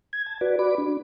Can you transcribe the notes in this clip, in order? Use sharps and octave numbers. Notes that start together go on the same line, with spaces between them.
G#6
A5
F#4 B4 D5
F#4 D5 B5 D6
D4